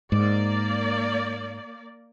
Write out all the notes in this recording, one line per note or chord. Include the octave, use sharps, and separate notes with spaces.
G#2 A#3 D5